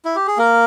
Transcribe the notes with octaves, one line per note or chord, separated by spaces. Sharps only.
E4
G4
G#4
A#3 A#4